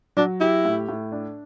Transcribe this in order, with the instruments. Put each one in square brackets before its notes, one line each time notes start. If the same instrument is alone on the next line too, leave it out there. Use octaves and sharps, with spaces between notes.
[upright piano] F#3 [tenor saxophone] D4
[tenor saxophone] E4 [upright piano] G4
[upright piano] A2
A2
D4